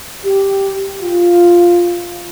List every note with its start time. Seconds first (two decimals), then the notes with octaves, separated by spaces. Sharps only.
0.25 G4
1.02 F4